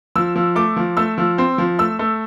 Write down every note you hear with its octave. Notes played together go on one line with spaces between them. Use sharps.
F3 E6
F3
A3 D6
F3
A3 E6
F3
C4
F3
A3 E6
A3